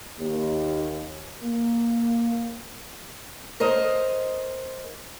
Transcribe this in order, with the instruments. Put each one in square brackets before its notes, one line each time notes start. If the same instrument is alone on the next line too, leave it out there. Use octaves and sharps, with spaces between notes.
[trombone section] D#2
A#3
[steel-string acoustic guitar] A#4 C5 D#5